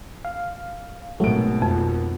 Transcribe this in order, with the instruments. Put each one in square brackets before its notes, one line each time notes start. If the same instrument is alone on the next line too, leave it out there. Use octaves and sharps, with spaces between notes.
[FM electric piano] F5
[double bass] G#1 B2 [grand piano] F#3 D7 [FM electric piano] A3
[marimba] F2